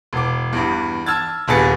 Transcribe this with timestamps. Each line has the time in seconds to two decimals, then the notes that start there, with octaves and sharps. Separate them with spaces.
0.13 E1 D6
0.53 E2 G2
1.06 A5 E6 F6 G#6 A6
1.48 D#1 G2 B3 G#4 A6 C#7